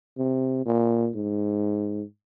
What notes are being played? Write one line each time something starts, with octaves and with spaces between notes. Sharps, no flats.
C3
A#2
G#2